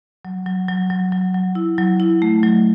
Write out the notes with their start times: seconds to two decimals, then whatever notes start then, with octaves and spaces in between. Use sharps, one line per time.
0.25 F#3
0.46 F#3
0.69 F#3
0.90 F#3
1.12 F#3
1.34 F#3
1.55 E4
1.78 F#3
2.00 E4
2.22 A3
2.43 F#3